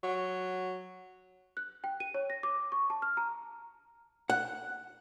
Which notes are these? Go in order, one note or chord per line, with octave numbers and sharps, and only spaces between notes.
F#3
F#6
G5
D#7
C#5
A#6
D6
C#6
A5
F6
A#5
F#5